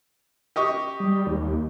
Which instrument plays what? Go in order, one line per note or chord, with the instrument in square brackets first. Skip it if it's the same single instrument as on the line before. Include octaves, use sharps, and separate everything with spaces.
[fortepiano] G4 D#5 C#6
[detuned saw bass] G3
D#2